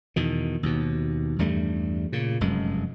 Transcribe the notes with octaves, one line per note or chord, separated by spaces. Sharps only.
E2 B2 D#3
D#2 B2
E2 G2 G3 A3
A#2 C#3
F1 F#2 G#3